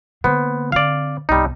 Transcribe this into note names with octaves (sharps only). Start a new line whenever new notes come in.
D3 A#3 B3 C5
D3 C4 D5 F5
G1 C2 G3 D#4